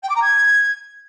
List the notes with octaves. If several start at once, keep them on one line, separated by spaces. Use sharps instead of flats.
G5
D6
A#5
G#6